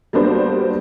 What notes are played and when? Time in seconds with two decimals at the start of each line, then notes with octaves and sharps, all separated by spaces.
0.13 F#3 G3 A#3 B3 D4 C5